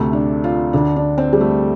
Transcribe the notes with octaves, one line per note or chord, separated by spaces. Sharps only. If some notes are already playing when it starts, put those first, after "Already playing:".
Already playing: D2 C3 A3
D4
F4
D2 D3 D4
D4
C4
G3
A3